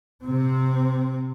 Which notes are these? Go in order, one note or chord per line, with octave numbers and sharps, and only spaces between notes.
C3 C4